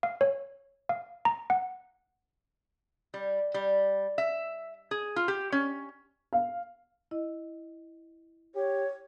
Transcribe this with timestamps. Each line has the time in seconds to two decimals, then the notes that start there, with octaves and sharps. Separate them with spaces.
0.03 F5
0.21 C#5
0.89 F5
1.25 A#5
1.50 F#5
3.14 G3
3.54 G3
4.18 E5
4.91 G#4
5.16 F4
5.28 G4
5.52 C#4
6.33 F5
7.11 E4 D#5
8.55 G4 C#5